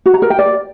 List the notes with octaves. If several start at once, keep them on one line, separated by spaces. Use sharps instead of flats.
F#4
A#5
A#4
G5
D5